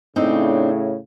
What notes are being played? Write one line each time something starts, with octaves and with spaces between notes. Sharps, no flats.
A2 C#3 C4 D4 D#4